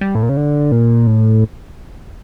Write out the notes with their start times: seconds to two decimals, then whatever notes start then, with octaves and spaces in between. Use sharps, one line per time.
0.01 G3
0.15 A2
0.23 A#2
0.29 C#3
0.37 D3
0.72 A#2
1.07 A2